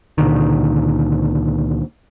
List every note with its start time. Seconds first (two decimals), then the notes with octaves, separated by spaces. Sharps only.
0.18 C#2 A#2 D3 D#3